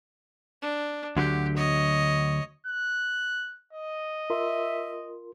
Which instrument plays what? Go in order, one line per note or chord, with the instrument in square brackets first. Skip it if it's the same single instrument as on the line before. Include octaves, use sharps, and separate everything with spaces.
[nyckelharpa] D4
[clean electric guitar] D2 D3 F#3 [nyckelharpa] G4
[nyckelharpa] C#5 D#5
[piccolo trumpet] F#6
D#5
[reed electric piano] F4 A#4 C6 [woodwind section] E5